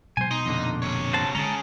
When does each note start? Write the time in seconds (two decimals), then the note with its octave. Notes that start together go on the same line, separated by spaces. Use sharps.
0.17 B2 F#3 G#3 C5 G#5
0.31 B2 D#4 C6
0.46 F2 A#2 D3
0.82 C3 C#5
1.13 F#4 C5 A5
1.35 D3 G#3 C#4 G#4 A5 A#5